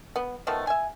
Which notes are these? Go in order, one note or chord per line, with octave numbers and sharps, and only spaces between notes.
B3
D#3 F3 A3 B3
E5 G#5